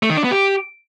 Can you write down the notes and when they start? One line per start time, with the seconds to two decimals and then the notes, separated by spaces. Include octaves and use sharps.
0.03 A3
0.10 D#3
0.17 D4
0.24 B3
0.31 G4